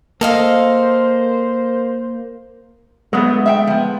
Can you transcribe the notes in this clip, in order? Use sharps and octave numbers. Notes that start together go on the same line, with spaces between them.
A#3 A4 C5 D#5 F5
F#3 G#3 A3 B3
E5 F5 G5
F3 B3